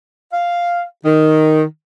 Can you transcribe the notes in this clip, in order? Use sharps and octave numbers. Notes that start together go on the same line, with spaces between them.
F5
D#3